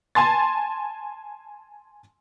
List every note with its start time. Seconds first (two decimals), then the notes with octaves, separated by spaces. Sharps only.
0.15 G#5 A5 C6 A6